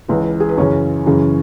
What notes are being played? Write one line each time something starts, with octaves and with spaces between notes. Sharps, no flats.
C#2 C#3 E3 B4
G#4
B4
F#2 C#3 E3 C#4 C#5
F#2 C#3 E3